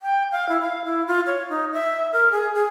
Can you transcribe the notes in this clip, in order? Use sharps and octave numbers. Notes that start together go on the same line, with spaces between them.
G5
F5
E4
F5
E4
F4
C#5
D#4
E5
A#4
G#4
G#4